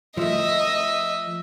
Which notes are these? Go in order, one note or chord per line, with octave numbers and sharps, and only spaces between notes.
F3 A3 D#5 E5